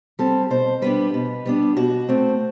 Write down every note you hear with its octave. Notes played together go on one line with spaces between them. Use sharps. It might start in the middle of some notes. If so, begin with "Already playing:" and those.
G3 C4 A4
B2 C5
G3 B3 D4 B4
B2
G3 B3 D4
B2 F#4
A3 C4